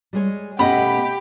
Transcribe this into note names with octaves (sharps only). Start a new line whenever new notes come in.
G3 G#3 C#5
B2 A3 B3 C#4 G4 D#5 F#5 B5